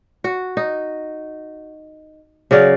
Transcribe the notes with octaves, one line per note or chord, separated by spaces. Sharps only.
F#4
D#4
C#3 F#3 D5 F5